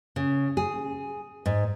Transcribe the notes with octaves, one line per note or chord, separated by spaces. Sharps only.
C#3
G#4
G#2